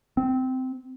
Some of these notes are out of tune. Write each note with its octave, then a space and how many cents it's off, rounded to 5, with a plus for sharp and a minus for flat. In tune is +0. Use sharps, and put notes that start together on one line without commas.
C4 -15